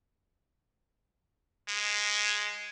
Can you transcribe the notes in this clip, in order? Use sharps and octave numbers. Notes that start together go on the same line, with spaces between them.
G#3